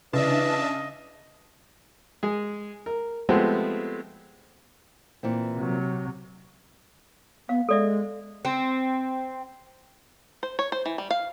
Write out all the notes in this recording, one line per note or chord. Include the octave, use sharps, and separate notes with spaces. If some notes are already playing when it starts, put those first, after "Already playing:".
C#3 E3 D4 D#5 E5 A5
G#3 G#4
A#4
F3 G#3 A3 B3 C4 G4
A#2 E3 C4
C3 F#3
B3 F5
G#3 A4 D5 E5
C4
C5
C#5
C5
E3
G3
F5